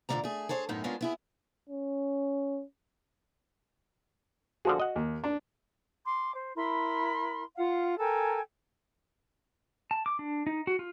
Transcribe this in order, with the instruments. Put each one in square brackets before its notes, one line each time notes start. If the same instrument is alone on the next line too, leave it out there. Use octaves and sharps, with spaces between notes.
[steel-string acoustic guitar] D2 A#2 D3 A#3 D5 A#5
A3 G#4
G#4 A4 C5 C#5
F#2 A2 B3 D#4
G#3 A#3 B3 C#4 D4 F4
B3 E4 G#4
[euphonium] C#4
[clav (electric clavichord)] D3 F3 G#4 [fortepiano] F#4
[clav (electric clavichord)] D#5 F#5
[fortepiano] D#2
D4
[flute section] C6 D6
C5
E4 A#4 B5 C6
F4 F5 F#5
A4 A#4 G5 G#5
[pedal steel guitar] A5
D6
D4
D#4
F#4
F4